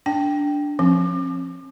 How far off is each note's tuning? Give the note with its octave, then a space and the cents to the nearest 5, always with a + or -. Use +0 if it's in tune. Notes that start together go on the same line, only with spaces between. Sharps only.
D4 -5 G5 +0
F3 +0 C4 +45